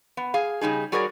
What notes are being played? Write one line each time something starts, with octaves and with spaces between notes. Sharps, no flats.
B3
G#4 F5
C#3 G3 D#4 G#4
G3 F#4 G#4 A#4 C#5 D5